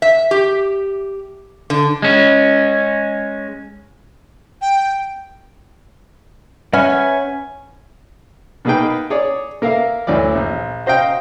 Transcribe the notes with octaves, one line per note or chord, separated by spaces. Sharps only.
E5
G4
D3
G#3 C#4
G5
C#4 B4 E5 F#5 G#5
B2 A#3 D#4 G#4 B4 G5
G#4 C#5 D5
A#3 A#4 E5 F5
D2 E3 F#3 D5
A#1
F#4 C5 D#5 F5 G5